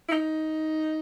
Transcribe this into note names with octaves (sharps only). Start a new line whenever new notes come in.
E4
D#4